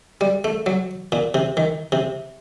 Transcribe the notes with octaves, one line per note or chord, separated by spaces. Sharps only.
G3
A3
F#3
A#2
C3
D#3
C3